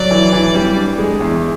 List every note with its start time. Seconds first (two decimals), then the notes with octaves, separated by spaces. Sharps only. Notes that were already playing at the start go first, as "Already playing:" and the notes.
Already playing: F#3 D5
0.11 E3
0.33 E3
0.54 G3
0.76 D4
0.98 G#3
1.21 E2